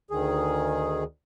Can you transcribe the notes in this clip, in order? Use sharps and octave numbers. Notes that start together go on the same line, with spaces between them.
D2 D#3 G#4